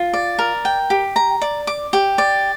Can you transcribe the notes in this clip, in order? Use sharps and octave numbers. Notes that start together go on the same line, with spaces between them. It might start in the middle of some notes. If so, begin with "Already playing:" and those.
Already playing: F4
D5
A#4
G5
G4
A#5
D5
D6
G4
D5